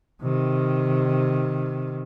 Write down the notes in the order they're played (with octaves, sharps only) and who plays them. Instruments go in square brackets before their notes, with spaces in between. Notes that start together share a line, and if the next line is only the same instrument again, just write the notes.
[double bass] C3 D#3